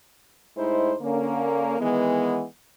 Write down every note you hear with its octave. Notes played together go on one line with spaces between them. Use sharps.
A2 G#3 D#4 E4 C5
D3 A#3 C#4
D#3 E3 G#3 B3